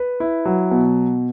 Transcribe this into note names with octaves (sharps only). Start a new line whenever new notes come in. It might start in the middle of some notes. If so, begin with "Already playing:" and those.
Already playing: B4
E4
F#3
B2